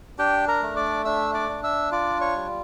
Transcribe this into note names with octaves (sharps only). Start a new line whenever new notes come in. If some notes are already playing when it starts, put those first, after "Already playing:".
D4 G4 G5
A#4 A#5
A3
D5 D6
D4 E5 E6
D5 D6
D4
E5 E6
F4 D5 D6
C#5 C#6
G3